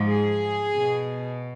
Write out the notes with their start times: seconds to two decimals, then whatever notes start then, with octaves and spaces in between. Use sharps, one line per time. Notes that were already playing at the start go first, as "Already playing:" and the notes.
Already playing: G#2 F3
0.09 G#4
0.74 B2